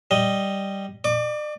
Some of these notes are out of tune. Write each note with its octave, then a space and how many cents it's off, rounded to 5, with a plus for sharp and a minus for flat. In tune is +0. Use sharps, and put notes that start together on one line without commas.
G3 +0 D#5 +0
D5 +40 D6 -20